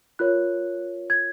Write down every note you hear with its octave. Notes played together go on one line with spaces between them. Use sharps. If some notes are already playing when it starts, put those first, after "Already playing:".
F4 A#4 C#5 F#6
G#6